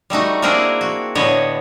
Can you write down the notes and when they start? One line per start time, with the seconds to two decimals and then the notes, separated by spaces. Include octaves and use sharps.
0.10 G3 A3 D#4 F#4
0.42 A#3 C4 D4 E4 G#4 A#4
0.81 F#4
1.15 A2 D3 B3 C#5 D#5